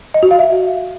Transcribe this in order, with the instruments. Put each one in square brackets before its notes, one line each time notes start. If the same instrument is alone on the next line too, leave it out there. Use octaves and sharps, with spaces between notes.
[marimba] D#5
F#4
F5
E5